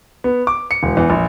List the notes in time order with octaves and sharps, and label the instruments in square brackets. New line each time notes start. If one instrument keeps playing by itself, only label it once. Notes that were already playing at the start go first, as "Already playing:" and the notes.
[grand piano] B3
D6
C#7
E1
E2
A#1